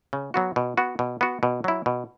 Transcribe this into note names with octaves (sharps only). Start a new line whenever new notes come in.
C#3
F#3 B3 F#4
B2
B3 F#4
B2
B3 F#4
B2
F#3 E4
B2